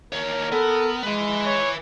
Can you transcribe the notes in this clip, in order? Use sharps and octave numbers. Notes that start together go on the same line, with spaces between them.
D#2 A#4 C#5
B3 A4
G#3 B4 G#5
C#5